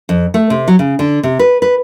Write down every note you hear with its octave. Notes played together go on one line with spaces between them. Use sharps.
F2
A3
C3
F#3
C#3
D3
C3
B4
B4